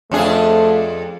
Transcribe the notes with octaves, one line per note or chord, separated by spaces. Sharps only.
F2 A3 D4 G#4